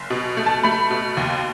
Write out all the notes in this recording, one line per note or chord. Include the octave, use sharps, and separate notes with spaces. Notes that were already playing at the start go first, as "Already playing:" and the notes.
Already playing: F#1
B2
A3
A5
A3 B5
B2
D#2